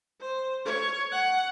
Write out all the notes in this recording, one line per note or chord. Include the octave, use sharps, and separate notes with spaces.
C5
C#5
F#5